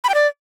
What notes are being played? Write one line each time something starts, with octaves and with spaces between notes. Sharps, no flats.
B5
G5
D5